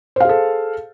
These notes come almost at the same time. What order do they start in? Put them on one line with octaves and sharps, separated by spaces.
C5 F5 G#4 A4